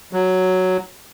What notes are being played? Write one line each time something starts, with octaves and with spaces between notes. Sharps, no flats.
F#3